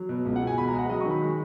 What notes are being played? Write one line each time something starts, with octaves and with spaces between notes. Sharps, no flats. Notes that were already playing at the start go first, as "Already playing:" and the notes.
Already playing: F#3
B2
C#2
F#5
B2
G#5
E1 B5
A#5
G#3
F#5
F#3 D#5
C#6
D#3
B5
G#3